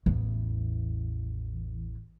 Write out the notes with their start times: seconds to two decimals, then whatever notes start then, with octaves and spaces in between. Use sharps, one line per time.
0.06 A1 E2